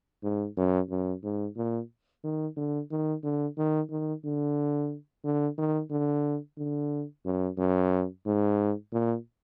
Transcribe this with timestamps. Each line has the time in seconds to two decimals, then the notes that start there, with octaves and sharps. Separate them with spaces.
0.23 G#2
0.57 F#2
0.90 F#2
1.23 G#2
1.56 A#2
2.24 D#3
2.56 D3
2.91 D#3
3.23 D3
3.57 D#3
3.90 D#3
4.25 D3
5.24 D3
5.58 D#3
5.91 D3
6.58 D3
7.25 F#2
7.58 F#2
8.26 G#2
8.92 A#2